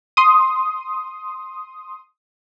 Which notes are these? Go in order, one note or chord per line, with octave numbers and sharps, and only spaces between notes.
C6 D#6